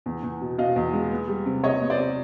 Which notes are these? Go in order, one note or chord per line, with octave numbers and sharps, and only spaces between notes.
E2
E2
B2
B2 D#5 F5
E2
G#3
B3
G3
C3
C3 C#5 D#5
B3
C5 D5
C3